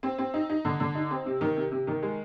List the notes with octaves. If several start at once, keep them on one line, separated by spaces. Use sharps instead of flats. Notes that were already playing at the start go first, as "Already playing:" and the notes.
C4
C4
D#4
D#4
D3
D3
D#4
C4
C3
D#3
C3
C3
D#3
G#3